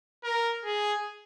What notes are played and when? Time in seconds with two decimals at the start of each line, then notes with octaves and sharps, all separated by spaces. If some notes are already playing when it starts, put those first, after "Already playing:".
0.24 A#4
0.65 G#4